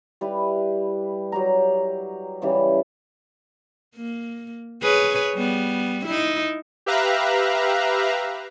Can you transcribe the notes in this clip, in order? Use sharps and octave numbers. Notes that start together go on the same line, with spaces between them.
G3 E4 B4
F#3 G4 A#5
C#3 E3 G3
A#3
G#4 B4 C#5
G3 B3
D#4 E4
G4 B4 E5 F5 A#5 F#6